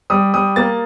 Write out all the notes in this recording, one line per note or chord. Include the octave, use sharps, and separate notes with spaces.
G3 D#6
G3 D#6
A#3 A6